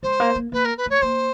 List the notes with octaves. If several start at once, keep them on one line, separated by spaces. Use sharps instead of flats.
G#3 C5
A#3
A#3
A#3 B4
A#4
B4
A3 C#5
A#3 C5